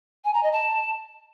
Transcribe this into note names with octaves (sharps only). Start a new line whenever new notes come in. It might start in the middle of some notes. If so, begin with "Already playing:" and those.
G#5
A#5
D#5
A5